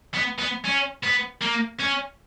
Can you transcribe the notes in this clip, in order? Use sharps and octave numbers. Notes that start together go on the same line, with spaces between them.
B3
B3
C#4
B3
A#3
C#4